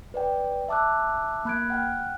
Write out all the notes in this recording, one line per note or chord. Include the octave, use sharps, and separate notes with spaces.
B4 D5 G5
E5 A5 D6 E6 F#6
A#3 B5 F#6 G#6 D7
F#5 G5 F6 F#6